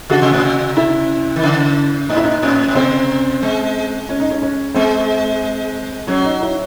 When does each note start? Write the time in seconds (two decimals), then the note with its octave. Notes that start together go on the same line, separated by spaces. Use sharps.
0.10 C#3 F#4
0.22 C3
0.33 A2
0.45 C3
0.77 E4
1.36 D#3
1.43 C#3
2.09 A2 D#4
2.17 E4
2.24 D#4
2.42 A2 C#4
2.68 A2
2.75 C3 C4
3.42 G#3
4.09 C#4
4.20 D#4
4.30 C#4
4.42 C#4
4.75 G#3 C4
6.07 F#3 C#4
6.24 D#4
6.42 E4